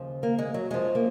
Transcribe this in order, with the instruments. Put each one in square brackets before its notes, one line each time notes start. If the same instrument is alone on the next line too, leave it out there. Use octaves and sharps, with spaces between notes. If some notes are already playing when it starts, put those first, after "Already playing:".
Already playing: [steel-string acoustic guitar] D#2 C#3 F3
A#3
G#3
F#3
F#2 F3 G#3
A#3